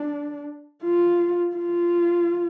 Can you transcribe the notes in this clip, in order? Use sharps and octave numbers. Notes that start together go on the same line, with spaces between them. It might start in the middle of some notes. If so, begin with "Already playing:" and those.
Already playing: D4
F4
F4